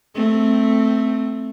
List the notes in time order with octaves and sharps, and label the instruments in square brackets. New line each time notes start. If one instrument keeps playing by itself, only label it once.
[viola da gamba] A3 C4